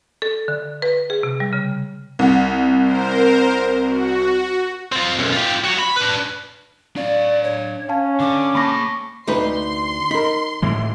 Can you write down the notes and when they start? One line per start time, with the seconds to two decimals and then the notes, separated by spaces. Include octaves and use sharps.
0.22 A4
0.48 D3
0.82 B4
1.10 G#4
1.23 C3
1.40 G3
1.53 C#3
2.19 C2 F#5
2.79 A#4 C5
3.83 F#4
4.92 C4 F4
5.19 B1 F#2
5.32 F4 G4
5.64 F#4 C#5
5.78 B5
5.96 D4 B4
6.96 D4 D5 F5
7.44 C#5
7.89 C#4 F5 A5
8.20 D3 D6
8.55 A#3 A5 B5 C#6 A#6
9.27 D2 D#4 B4 C6
10.11 D#4 A#4 B5
10.62 A2 E3 G#3